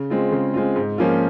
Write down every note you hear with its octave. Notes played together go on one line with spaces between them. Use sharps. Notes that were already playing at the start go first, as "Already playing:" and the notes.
Already playing: C#3
G#3 C4 F4
C#3
G#3 C4 F4
G#2
F3 A#3 C#4 F4